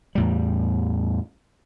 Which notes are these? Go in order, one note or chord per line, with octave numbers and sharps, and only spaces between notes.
E2 A2 G3